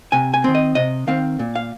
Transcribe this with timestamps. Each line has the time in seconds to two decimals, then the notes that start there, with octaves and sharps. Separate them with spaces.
0.12 C3 G#5
0.34 G#5
0.44 D#3 C4
0.55 D#5
0.75 C3 D#5
1.07 D#3 C4 F5
1.39 A#2
1.55 F5